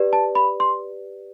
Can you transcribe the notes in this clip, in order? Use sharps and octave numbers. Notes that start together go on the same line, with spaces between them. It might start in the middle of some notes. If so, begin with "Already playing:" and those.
Already playing: G4 B4 D5
A5
B5
C6